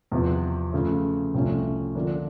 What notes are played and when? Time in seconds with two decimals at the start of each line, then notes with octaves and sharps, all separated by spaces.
0.12 E2 C3 F3
0.73 C#3 F3 A3
1.34 C2 C3 F3 A3 C#4
1.95 D3 F3 A#3 D4